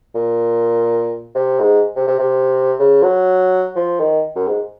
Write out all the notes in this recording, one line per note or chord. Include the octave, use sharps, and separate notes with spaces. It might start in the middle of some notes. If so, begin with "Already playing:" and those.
A#2
C3
G#2
C3
C3
C3
C#3
F#3
F3
D#3
F#2
G#2